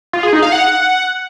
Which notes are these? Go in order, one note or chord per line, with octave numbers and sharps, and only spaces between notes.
F4
G#4
D#4
F5
F#5